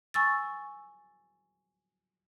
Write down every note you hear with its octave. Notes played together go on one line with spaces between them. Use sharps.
G#5 C#6 E6 A6